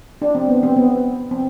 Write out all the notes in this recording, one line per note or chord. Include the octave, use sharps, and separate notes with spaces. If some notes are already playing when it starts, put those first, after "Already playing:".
D4
C4
B3
C4
B3
C4